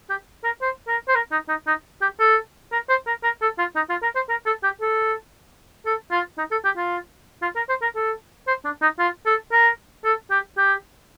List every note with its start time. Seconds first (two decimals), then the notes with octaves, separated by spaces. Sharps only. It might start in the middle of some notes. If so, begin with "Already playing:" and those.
0.10 G4
0.44 A#4
0.61 C5
0.88 A#4
1.08 C5
1.15 A#4
1.32 D#4
1.49 D#4
1.67 D#4
2.02 G4
2.20 A4
2.72 A#4
2.89 C5
3.07 A#4
3.24 A#4
3.42 A4
3.58 F4
3.76 D#4
3.89 F4
4.02 A#4
4.15 C5
4.29 A#4
4.46 A4
4.64 G4
4.81 A4
5.86 A4
6.11 F4
6.38 D#4
6.51 A4
6.65 G4
6.77 F4
7.42 F4
7.56 A#4
7.69 C5
7.82 A#4
7.96 A4
8.47 C5
8.65 D4
8.82 D#4
8.99 F4
9.26 A4
9.52 A#4
10.05 A4
10.31 G4
10.57 G4